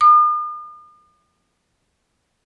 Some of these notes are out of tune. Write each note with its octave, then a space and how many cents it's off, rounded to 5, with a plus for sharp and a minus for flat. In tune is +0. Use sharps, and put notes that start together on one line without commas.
D#6 -45